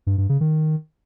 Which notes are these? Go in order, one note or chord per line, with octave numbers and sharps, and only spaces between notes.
G2
G2
C#3
D#3